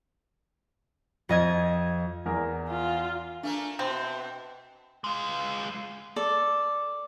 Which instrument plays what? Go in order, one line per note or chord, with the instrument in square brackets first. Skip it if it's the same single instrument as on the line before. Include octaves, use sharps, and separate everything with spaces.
[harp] F2 D#5 G#6
[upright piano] E2 A#4
[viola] F4
[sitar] A3 A#3 A#4 [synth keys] D4 G#5
[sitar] B2 [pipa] C4 [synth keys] E5 C6 F#6
[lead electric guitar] G#3 F4
[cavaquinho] A4 D5